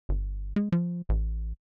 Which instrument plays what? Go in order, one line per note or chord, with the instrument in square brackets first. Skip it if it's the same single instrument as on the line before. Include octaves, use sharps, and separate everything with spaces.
[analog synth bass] G1
G#3
F3
A1